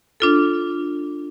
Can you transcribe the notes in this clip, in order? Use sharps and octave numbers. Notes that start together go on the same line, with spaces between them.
D4 F4 A4